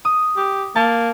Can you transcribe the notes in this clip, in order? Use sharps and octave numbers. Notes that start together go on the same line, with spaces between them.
D#6
G4
A#3 A5